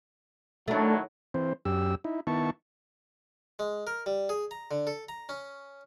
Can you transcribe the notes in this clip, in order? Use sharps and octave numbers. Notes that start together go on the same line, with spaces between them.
A2 D#3 F#3 A3 D4
E3 C4 C5
F#2 G4 E6
D#4 E4
D#3 B3 E4 A5 C#6
G#3
A#4
G3
G#4
A#5
D3
A4
A#5
C#4